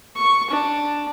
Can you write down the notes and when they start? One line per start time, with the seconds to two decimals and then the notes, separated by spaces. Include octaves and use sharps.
0.16 C#6
0.51 D4